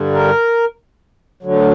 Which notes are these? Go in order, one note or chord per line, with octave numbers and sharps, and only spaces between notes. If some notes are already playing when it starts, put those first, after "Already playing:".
Already playing: G2 D3 G3
A#4
D2 D3 F#3